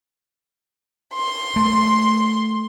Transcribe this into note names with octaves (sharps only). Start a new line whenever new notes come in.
C6
A3